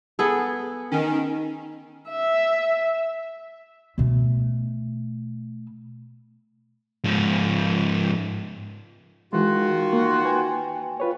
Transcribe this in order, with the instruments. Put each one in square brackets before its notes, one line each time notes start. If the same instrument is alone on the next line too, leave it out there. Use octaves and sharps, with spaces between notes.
[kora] B3 G#4 A4
[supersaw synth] D#3 [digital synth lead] C#4
[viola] E5
[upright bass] B2 A3
[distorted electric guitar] G#2 F3
[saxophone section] D#3 F4 F#4 [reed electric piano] E3 G#3
[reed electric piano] A#3
B4 G5 G#5
F4 B4 C#5